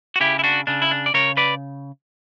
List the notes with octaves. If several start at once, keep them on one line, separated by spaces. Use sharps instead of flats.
F#4
C#3 E4 G4
E4
D4 F#4
C#3 D4
E4
D4
D5
C#3 A#4 C#5
B4 D5